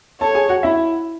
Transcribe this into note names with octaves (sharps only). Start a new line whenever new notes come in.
A4 C#5 A5
G#4 G#5
F#4 F#5
E4 E5